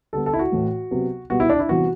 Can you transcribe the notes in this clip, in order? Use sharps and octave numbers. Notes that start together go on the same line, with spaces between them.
D3 G3 B3 A4
A4
E4
F#4
A2 E3 A3
C3 F#3 B3
B2 G3 B3 F#4
E4
D4
E4
C3 E3 G3 B3 F#4